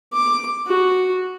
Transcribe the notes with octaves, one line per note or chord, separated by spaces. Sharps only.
D6
F#4